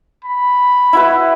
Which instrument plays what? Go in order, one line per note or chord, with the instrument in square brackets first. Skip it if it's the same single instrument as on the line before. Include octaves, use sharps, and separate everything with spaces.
[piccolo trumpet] B5
[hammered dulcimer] E4 F#4 B4